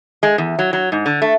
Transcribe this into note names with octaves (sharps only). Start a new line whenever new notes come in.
G#3
E2
F#3
F#3
G#2
D3
A3